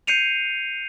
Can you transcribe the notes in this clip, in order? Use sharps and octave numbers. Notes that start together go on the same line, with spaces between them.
G6 C7 C#7 D#7 F7